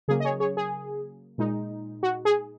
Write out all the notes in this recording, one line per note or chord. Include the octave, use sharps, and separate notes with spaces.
C#3 F#3 A#3 G#4
D#5
G#4 C#5
G#4 C#5
G#4
A#2 G#3 D#4
F#4
G#4